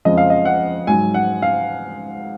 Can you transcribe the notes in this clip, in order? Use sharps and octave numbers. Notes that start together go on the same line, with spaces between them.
F2 C#3 F3 G#3 D#5
F5
D#5
F#5
G#2 F#3 G#5
F#5
F5